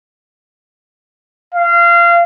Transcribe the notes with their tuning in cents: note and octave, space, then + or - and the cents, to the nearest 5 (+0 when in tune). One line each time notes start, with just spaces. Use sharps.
F5 -25